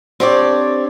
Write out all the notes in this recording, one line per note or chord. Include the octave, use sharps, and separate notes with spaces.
C4 D4 G4 A4 C#5 D5